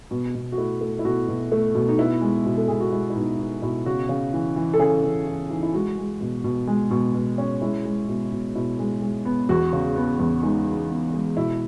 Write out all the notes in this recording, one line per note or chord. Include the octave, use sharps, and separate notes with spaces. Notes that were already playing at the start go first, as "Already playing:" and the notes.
B2
B2
F#4
A3 E4
A3
E4
B2 F#4
B2
A3
B2
D#4
B3 E4
G#3
B2
A4
B2 G#4
F#4
G#3 E4
E4
B2 D#4
B3 E4
B2 E4
C#3 F#4
C#3
E3
E3
A4
C#3 G#4
C#3
E3
E3 D#4
E4
G#3 F#4
G#3
B2
B2
G#3
B2
B2
C#4
G#3 E4
G#3
B2
B2
B2 E4
G#3
G#3
B3
E2 F#4
C#3
B3
E2
G#3 D#4
G#3
B3
G#3
B2 E4